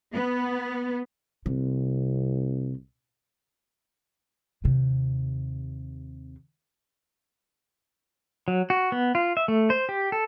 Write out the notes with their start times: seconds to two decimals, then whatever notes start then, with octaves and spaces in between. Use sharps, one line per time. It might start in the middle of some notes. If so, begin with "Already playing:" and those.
0.13 B3
1.46 C2 C3
4.64 D#2 C3
8.48 F#3
8.70 F#4
8.92 B3
9.15 F4
9.37 E5
9.48 A3
9.70 C5
9.89 G4
10.12 A4